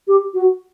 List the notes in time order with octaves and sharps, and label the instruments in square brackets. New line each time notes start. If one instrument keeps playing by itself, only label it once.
[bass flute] G4
F#4